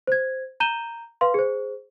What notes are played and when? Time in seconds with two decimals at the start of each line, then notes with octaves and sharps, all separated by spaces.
0.07 C5 G#6
0.60 A#5 G6 D#7 E7 G7
1.21 B4 F5 C6
1.34 G#4 C5